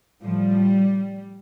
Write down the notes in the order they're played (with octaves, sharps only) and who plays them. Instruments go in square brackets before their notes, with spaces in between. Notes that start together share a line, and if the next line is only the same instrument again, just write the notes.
[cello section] A2 F3 G3